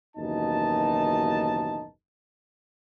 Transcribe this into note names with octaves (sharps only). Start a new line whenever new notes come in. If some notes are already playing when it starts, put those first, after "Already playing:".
F#1 D#2 B2 E3 D#4 A5